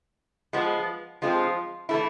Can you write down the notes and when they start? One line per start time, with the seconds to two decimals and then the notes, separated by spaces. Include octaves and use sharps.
0.53 F3 G#3 B3
1.22 F3 G#3 C4 F4
1.89 E3 A3 E4